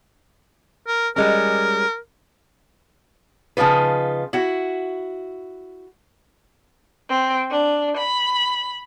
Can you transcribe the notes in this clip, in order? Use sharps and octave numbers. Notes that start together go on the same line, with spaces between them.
A#4
G3 G#3 C#4 A#4
C#3 F3 D#4 F4 B4
E4 F#4
C4
D4
B5